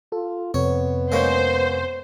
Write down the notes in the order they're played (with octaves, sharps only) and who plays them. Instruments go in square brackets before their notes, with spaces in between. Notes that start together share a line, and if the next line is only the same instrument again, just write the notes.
[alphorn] F4 [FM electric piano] A4
[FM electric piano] F2 C3 C4 [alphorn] B3 [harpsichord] C#5
[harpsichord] G#3 A#3 C#4 [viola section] C5